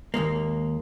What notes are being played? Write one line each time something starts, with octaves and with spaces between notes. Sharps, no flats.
D#2 A#2 G#3 A#3